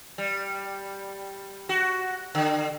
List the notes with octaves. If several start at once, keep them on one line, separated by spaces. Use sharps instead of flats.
G3
F#4
D3